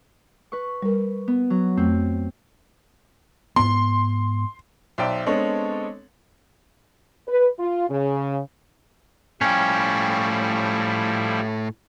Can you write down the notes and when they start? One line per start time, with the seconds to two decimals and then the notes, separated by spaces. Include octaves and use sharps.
0.52 B4 C#6
0.82 G3 A#4
1.28 B3
1.50 F#3
1.77 F2 A3 C4
3.56 G#2 B3 C6
4.98 B1 C5 D5 E5 G5
5.26 G#3 B3 C4 D4 A4 C#5
7.28 B4
7.59 F4
7.89 C#3
9.41 A2 F3 G3 C#4 E4 G5